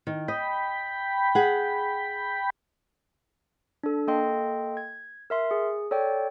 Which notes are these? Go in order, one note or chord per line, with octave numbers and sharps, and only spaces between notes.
D#3
D#5 G5 B5
G#4 F#5
D4 A4
A#3 A4 D#5 G5 C6
G#6
A#4 E5 C6
G#4
A4 C#5 D5 G5